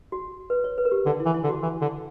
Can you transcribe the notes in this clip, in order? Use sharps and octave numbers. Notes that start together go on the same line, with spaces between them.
F#4
B4
C#5
B4
A#4
G4
D3 D4
E4
E3
E4
D3
F#4
E3
D3